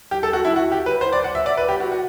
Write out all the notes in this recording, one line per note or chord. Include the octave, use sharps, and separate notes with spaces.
G4
A4
F#4
E4
F#4
G4
B4
C5
D5
F#5
E5
D5
B4
G4
F#4
F#4